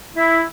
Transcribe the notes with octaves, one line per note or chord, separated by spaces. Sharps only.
E4